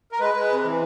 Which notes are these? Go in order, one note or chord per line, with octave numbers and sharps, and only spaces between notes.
A#4
G#3 B4
G#3
C3
E3